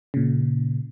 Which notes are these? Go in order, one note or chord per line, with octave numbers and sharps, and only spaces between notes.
A#2 C#3